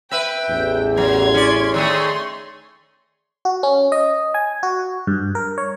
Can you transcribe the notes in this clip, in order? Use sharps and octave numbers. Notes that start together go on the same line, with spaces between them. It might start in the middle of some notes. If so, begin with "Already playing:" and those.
B4 E5 G5
A1 E2
F#3 C6 G#6
C#4 D5
D#3 A3 G#4 C#5 C6
F#4
C#4
D#5
G#5
F#4
G2
A#4
C#5